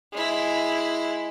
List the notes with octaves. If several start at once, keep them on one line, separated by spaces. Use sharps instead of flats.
G#3 E4